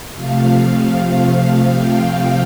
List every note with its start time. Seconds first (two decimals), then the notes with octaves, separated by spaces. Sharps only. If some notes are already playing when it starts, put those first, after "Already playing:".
0.14 C3 F3 A3 F5
1.78 G5